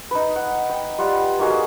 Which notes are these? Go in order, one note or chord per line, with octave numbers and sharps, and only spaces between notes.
D#4 B4
F#5
G5
G3 F4 F#5
A#3 D#4 F#4 G#4